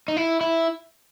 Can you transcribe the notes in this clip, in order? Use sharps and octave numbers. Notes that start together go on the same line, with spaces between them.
D#4
E4
E4